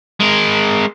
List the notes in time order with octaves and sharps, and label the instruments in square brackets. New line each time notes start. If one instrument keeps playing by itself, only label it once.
[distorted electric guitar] G#3 A#4